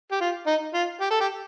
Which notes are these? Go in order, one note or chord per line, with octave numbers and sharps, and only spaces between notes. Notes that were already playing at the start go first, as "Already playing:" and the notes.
G4
F4
D#4
F4
G4
A4
G4